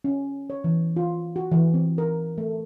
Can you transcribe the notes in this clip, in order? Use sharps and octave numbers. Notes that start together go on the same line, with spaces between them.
C#4
C#5
E3
F4
F#4
E3
C4
A#4
A3